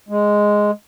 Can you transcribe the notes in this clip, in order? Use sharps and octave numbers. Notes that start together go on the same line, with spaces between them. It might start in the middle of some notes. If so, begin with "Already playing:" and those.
G#3